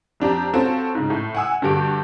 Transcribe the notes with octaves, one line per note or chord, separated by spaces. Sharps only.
F2 D4 G4 A#5
C4 C#4 F4 F#4 A4
G#2 C#3
A2
F#5 G#5 E6
G2 D3 F#4 G4 D7